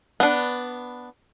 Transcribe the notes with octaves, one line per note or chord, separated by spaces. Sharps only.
B3 D4